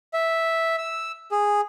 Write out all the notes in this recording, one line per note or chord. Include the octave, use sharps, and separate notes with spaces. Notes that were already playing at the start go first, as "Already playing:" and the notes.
E5
E6
G#4